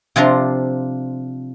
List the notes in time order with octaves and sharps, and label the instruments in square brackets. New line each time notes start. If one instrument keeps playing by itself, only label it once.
[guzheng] C3 F3 D4 A#5 C6